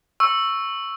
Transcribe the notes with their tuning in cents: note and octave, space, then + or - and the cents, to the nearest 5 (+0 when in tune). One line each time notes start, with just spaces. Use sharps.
C#6 +0 E6 +0